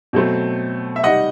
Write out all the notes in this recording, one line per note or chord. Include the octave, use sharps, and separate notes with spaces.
B2 F#3 A3 C4
E5
C3 D#3 G3 D#5 F#5